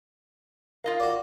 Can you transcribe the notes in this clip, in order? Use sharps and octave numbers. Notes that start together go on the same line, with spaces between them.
F4 A#4 D#5 F5
F#4 D5